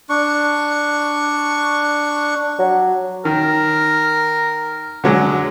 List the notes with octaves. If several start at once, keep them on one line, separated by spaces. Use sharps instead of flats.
D4 C#6
F#3
D#3 A#4
D3 F#3 G#3